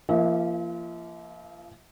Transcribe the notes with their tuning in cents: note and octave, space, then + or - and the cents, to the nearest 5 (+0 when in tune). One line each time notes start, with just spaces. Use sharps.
F3 -35 A#3 +0 E5 -45